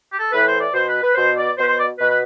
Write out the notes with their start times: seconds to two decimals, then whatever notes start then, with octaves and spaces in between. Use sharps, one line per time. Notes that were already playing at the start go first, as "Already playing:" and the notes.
0.11 G4
0.18 A4
0.31 A2 E3 B4
0.46 C5
0.59 D5
0.73 B2 C5
0.88 B4
1.01 B4
1.15 B2 C5
1.36 D5
1.57 B2 C5
1.62 B4
1.67 C5
1.77 D5
1.98 B2 B4
2.09 B4